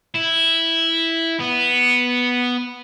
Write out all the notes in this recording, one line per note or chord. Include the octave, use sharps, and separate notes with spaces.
E4
B3